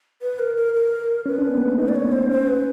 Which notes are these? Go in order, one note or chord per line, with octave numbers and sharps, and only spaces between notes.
B4
A#4
A#4
A#4
C#4 B4
D4
B3
A#3
A3
D#4 B4
D5
C#5
B3
C5
C#4 C5
B4